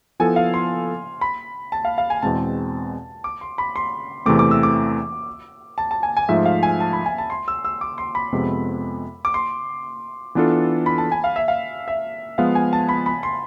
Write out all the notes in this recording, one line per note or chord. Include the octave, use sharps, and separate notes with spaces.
F3 B3 E4 A4 G#5
F5
C6
B5
A5
F5
F5
G#5
E2 B2 G#3 C4 A5
D6
C6
B5
C6
E2 C3 E3 A3 C4 D6
D6
E6
D6
A5
A5
G#5
G#5
G#2 F3 A3 E5
F5
G#5
A5
B5
G#5
A5
C6
E6
E6
D6
C6
B5
F2 C3 G#3 B3
D6
C6
E3 B3 D4 F4 A4
B5
A5
G#5
F5
E5
F5
E5
F3 G#3 B3 F5
G#5
A5
B5
B5
C6